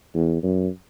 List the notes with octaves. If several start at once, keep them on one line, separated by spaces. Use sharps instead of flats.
E2
F#2